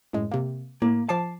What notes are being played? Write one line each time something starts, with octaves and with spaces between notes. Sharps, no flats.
F#2 A2 G#3
C3 A#3
A2 A#3
F3 A5 D6 C7